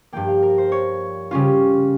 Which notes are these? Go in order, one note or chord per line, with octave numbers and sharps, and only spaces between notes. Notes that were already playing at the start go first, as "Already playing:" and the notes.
G2 F3 A#3 G5
F5
A#4
C5
C#5
C#3 G3 C#4 F4